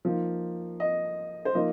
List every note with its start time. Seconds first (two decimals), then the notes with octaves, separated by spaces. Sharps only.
0.05 F3 A#3 D#4
0.80 D#5
1.45 C5
1.55 F3 A#3 D#4 D#5